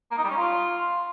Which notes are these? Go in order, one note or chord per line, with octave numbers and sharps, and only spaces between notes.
A#3
D#4
G3
C#4
F4